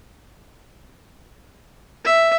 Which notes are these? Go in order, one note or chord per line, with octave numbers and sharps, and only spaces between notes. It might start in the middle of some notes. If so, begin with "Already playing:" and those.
E5